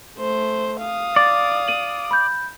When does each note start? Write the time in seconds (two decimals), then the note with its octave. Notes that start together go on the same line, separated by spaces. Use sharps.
0.18 A3 C5
0.82 F5 D#6
1.16 D5 A6
1.68 D#7 F#7
2.11 B5 G6